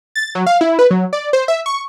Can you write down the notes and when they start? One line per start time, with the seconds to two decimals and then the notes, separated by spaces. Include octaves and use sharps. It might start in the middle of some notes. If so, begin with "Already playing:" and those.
0.15 A6
0.35 F#3
0.47 F5
0.61 E4
0.79 B4
0.91 F#3
1.13 D5
1.33 C5
1.48 E5
1.66 C#6